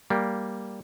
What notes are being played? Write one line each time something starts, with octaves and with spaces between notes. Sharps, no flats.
G3 A#3